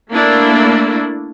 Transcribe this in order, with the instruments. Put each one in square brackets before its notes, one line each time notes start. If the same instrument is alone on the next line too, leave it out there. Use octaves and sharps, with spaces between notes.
[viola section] A3 A#3 D4 E4